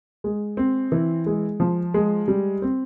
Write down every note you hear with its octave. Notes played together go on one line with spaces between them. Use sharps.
G#3
C4
E3
G#3
F3
G#3
G3
C4